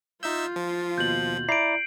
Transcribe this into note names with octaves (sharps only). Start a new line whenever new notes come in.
D#4 F4 E5 E6 G6
F3
D#2 B2 G6 F#7
E4 D5 A#5 C7 D7